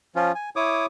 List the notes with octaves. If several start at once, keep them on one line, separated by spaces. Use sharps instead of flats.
F3 C#4 F4
G#5
E4 C#5 D6 D#6